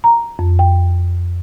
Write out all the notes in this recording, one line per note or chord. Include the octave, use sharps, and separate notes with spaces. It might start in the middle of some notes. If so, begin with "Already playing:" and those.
A#5
F2
G5